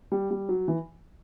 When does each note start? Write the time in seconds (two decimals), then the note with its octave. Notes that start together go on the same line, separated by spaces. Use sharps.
0.12 G3
0.31 G3
0.49 F#3
0.68 E3